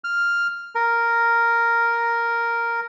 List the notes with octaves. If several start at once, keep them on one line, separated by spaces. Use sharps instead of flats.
F6
A#4